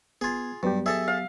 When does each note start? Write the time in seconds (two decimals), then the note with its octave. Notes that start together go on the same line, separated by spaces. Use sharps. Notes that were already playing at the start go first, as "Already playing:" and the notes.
0.21 B3 F4 G#4 G#6
0.63 G2 F#3 B3 G4
0.86 G#4 A4 D#5 E5
1.08 F5